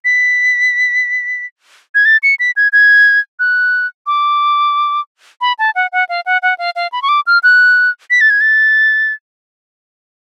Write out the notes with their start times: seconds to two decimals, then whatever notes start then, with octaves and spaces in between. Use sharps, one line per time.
0.05 B6
1.95 G#6
2.05 A6
2.23 C#7
2.40 B6
2.57 G#6
2.73 G#6
3.39 F#6
4.07 D6
5.41 B5
5.59 A5
5.75 F#5
5.92 F#5
6.09 F5
6.26 F#5
6.42 F#5
6.59 F5
6.76 F5
6.92 B5
7.02 C#6
7.09 D6
7.27 F6
7.43 F#6
8.10 B6
8.21 A6
8.30 G#6
8.41 A6